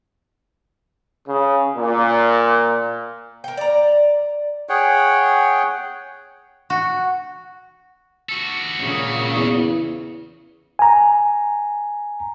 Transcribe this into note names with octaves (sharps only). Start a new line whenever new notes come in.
C#3
A#2
A#4 G5
D5 A#5
G#4 C#5 F#5 G5
F#4
F#4 A4
A#2 C#3
E2
G#5 A#5